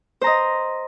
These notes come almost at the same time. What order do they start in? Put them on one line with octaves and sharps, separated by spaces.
C5 A#5 D#5